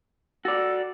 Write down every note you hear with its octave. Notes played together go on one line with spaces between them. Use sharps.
F#4 A4 D5